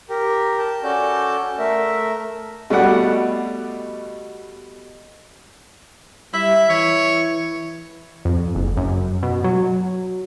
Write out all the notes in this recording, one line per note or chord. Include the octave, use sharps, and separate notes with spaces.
G4 A#4
A#4 A5 G6
C#4 F#4 A4 D5 A5 G6
A3 A#4 E5
B2 G3 A3 D5 F#5
G3 E4 E5
E3 C#5
F2
F#1
F#2
B2
F#3